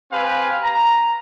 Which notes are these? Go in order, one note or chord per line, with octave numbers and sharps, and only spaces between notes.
C4 G4 B4 F5 G#5
A#5